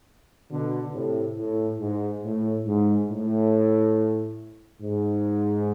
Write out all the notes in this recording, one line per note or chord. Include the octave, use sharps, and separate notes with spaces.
B2 D3
A2 C3
A2
G#2
A2
G#2
A2
G#2